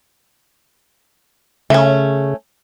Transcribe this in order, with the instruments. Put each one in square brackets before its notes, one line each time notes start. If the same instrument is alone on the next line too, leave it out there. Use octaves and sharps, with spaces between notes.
[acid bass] C#3 [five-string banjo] A3 C#4